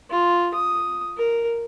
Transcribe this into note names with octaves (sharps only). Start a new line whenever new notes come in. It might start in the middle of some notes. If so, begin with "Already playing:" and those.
F4
D#6
A#4